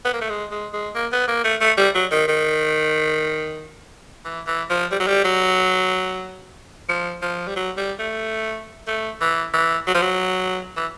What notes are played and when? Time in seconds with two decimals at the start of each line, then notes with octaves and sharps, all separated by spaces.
0.05 B3
0.13 A#3
0.21 A3
0.29 G#3
0.51 G#3
0.73 G#3
0.95 A#3
1.12 B3
1.28 A#3
1.44 A3
1.61 A3
1.77 G3
1.95 F#3
2.11 D#3
2.28 D#3
4.25 E3
4.47 E3
4.70 F3
4.92 G3
5.00 F#3
5.07 G3
5.24 F#3
6.89 F3
7.22 F3
7.48 G3
7.56 F#3
7.77 G3
7.99 A3
8.87 A3
9.21 E3
9.54 E3
9.87 F#3
9.95 F3
10.02 F#3
10.76 E3